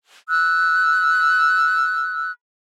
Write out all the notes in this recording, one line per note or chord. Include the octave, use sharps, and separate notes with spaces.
E6 F#6